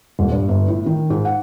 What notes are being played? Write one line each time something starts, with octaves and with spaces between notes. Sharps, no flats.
D#1
G2
G1
A2
D#3
G#2
F#5